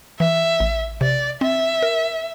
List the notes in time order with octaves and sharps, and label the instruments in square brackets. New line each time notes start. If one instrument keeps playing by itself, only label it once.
[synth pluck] E3 [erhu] E5
[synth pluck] A1
[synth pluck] C3 [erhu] D5
[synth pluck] C4 [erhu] E5
[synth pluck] A#4